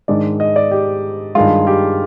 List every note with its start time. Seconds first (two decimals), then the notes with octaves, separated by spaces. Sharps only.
0.08 G#2 D#3 G#3 D4 D5
0.40 D#5
0.56 D5
0.71 G4
1.35 G2 D#3 G#3 F4
1.67 G4